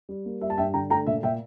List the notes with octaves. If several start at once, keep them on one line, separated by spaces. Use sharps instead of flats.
G3
A#3
G3 E5
A5
G2 E5 G5
D3 G5 A#5
A3 G5 A#5
A#2 E5
A#2 E5 G5